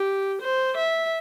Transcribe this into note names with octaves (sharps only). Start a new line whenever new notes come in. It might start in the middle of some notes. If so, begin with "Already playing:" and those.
Already playing: G4
C5
E5